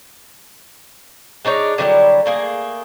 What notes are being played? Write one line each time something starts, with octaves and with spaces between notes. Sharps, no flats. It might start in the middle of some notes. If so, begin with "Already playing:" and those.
G#3 D4 D#4 C#5
D3 F#3 G3 E4
A3 A#3 G#4